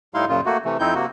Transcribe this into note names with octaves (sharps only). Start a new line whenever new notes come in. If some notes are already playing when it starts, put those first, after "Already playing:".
A2 G3 D#4 E4 F5 C6
F#2 A#2 C#3 F4
A3 A#3 F#4
C3 E3 A3
F2 C4 D#4 E4 G6
C3 A#3 F#4